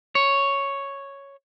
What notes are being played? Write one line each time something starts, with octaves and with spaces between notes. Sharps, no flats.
C#5